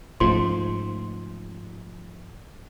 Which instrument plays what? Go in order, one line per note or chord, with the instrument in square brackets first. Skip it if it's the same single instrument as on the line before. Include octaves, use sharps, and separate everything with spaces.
[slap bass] G#2 [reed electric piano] F3 [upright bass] A3 C#4 [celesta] C6